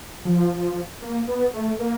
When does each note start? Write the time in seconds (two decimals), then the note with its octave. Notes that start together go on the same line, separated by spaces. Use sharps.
0.25 F3
1.02 A#3
1.27 B3
1.54 A3
1.79 A#3